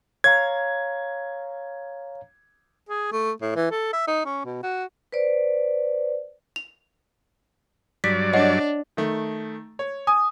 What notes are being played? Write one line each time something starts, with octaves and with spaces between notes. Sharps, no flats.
C#5 F5 A#5 G#6
G#4
A3
A2
E3
A4
E5
D#4
C#4
B2
F#4
B4 C5 D5
F7
G2 F#3 D5 B6
D4 C#5 D#5 F#5
D#3 A3
C#5
G#5 D#6